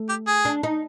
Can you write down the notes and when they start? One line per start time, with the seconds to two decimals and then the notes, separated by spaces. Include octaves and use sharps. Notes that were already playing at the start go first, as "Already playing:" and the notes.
Already playing: A3
0.09 G4
0.27 G#4
0.45 D4
0.63 D#4